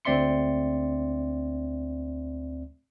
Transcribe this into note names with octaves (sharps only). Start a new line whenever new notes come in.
D2 C4 D5 E5 C6 C#7